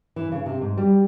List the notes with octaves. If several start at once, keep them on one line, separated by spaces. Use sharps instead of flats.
E3
C#3
C3
G#2
G3